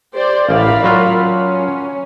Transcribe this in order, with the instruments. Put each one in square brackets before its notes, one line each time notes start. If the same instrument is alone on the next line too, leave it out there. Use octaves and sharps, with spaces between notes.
[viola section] G4 C5 D5
[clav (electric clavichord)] A1 D5 [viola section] A#4 F5 B5
[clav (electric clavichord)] F#3 F4
[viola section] C#4